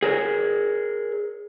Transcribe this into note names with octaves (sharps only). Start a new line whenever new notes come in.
G#4 A#4 C#5